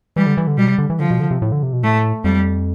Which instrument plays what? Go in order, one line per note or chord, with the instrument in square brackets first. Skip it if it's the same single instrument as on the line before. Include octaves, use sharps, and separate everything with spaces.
[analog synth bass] E3 [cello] G3
[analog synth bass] D3
E3
D3
[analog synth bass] B2 [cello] G3
[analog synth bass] C3
D3
E3
[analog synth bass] D3 [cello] F3
[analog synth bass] B2
D3
C3
A2
D3
C3
B2
[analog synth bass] A2 [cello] A3
[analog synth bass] F2 [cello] G3